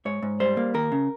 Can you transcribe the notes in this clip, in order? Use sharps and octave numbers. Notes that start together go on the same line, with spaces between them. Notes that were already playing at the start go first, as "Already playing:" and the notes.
G#2 C#5
G#2
G3 C5
A#3
D#2 A#4
C#3